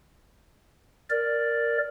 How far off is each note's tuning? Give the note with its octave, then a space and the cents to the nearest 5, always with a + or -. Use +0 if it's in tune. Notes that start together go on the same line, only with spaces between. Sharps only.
A#4 +0 D5 +0